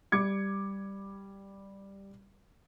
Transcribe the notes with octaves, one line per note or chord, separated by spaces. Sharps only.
G3 D6 G#6 C#7